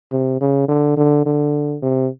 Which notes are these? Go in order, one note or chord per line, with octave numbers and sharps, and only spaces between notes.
C3
C#3
D3
D3
D3
C3